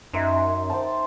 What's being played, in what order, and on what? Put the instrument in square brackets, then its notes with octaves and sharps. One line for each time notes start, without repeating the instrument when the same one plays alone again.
[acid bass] F#2 [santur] D#4 E5 C6
[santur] C5 G5 A5